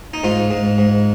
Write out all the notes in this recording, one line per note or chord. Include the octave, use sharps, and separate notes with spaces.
D#4
G#2 F4
G#2
G#2